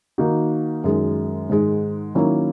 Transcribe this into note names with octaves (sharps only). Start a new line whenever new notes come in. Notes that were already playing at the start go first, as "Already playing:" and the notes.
D#3 A#3 D#4 F#4
F#2 D#3 G#3
G#2 D#3 G#3
D#3 F#3 A#3 C#4 E4